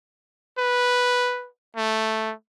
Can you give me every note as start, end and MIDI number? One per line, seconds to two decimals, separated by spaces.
0.58 1.48 71
1.76 2.33 57